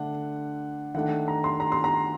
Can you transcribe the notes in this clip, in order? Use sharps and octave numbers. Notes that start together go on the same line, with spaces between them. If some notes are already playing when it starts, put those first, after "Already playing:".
Already playing: D3 A3 D4 F#5
D#3 A3 D4 F#5
A#5
C6
A#5
C6
A#5